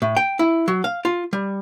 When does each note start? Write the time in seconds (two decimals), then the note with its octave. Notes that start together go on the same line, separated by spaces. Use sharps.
0.02 A2
0.16 G5
0.39 E4
0.68 F#3
0.84 F5
1.05 F4
1.33 G3